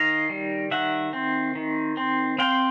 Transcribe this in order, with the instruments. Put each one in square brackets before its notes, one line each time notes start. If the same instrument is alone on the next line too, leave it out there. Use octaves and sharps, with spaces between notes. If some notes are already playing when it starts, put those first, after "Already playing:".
Already playing: [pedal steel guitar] D#3 D#5 F5
G3
D#3 E5 F#5
C4
D#3
C4
C4 F5 G5